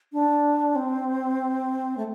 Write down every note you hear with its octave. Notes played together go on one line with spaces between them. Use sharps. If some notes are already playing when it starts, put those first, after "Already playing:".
D4
C4
A3